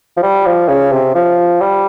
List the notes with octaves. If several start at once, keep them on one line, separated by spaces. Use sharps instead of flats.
F3
G3
F3
C#3
C3
F3
G3